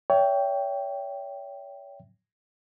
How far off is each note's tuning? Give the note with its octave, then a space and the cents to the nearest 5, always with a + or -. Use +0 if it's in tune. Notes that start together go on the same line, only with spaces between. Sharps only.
C#5 +35 E5 +0 G5 +0